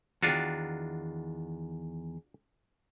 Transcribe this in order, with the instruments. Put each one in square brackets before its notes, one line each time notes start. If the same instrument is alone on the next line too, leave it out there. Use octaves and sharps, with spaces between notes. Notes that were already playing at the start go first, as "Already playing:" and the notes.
[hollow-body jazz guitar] E2 D#3 [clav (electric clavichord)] D4 F4 F#4